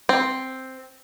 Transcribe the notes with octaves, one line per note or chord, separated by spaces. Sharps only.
C4